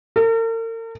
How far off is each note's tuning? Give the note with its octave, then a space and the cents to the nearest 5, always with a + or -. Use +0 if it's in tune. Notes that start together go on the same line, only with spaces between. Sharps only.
A#4 -45